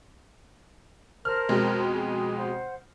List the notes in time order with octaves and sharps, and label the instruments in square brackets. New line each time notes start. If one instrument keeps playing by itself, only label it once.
[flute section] A#4 C5 A5 [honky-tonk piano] F6
[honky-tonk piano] F2 B2 G#3
[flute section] G#4
C5 F#5